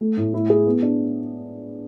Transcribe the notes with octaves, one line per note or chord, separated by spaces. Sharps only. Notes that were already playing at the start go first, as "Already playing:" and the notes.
A3
A2
E4
G#4
B3
D4